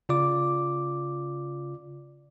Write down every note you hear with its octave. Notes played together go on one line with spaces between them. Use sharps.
C#3 F4 D5 D6